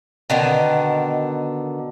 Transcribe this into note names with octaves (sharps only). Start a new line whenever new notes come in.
B2 D3 D#3